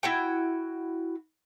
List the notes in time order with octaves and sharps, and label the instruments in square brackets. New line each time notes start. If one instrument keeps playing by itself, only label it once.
[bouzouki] E4 F#4 G5